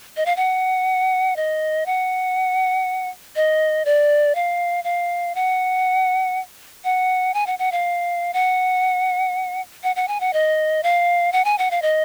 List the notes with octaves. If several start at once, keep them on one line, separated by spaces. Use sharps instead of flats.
D#5
F5
F#5
D#5
F#5
D#5
D5
F5
F5
F#5
F#5
G#5
F#5
F#5
F5
F#5
F#5
F#5
G#5
F#5
D#5
F5
F#5
G#5
F#5
F5
D#5